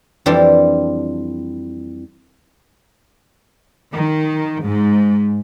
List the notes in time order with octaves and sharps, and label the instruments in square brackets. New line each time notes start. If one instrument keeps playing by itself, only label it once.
[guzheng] F2 E3 G3 D4 G4 C5
[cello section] D#3
G#2